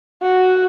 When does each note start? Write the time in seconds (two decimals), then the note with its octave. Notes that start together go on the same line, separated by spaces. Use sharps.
0.22 F#4